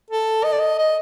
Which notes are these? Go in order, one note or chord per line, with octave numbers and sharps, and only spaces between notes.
A4
D#5
D5
D#5
D#5